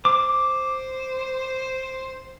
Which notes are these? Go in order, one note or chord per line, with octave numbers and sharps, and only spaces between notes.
C5 D6